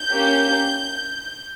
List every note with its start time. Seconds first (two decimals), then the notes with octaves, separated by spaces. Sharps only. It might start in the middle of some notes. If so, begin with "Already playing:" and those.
Already playing: G6
0.10 A#3 C#4 G4